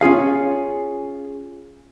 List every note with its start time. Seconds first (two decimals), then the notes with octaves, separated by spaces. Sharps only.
0.01 C#4 F4 G#4 F5